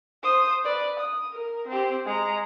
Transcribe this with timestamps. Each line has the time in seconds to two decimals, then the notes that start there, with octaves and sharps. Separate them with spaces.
0.23 C5 D#6
0.65 B4 D5
1.00 D#6
1.32 A#4
1.68 C4 G4
2.06 G#3 A#5